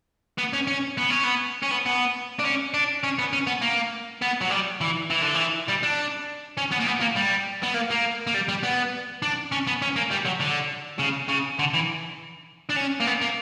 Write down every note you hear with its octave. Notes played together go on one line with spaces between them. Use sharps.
B3
C#4
C#4
B3
C#4
B3
C#4
B3
B3
D4
C#4
D4
C#4
B3
C#4
B3
A#3
B3
F#3
G3
E3
E3
D3
E3
G3
D4
C#4
B3
A#3
B3
A#3
G3
B3
A#3
A#3
A#3
G3
G3
B3
D4
C#4
B3
C#4
A#3
G3
F#3
D3
C#3
C#3
D3
E3
D4
C#4
A#3
B3
A#3